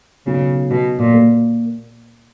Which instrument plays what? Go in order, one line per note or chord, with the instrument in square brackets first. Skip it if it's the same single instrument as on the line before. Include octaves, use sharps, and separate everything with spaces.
[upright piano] B1 [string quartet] C#3
[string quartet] B2 [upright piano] F#3
[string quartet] A#2
[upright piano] A#3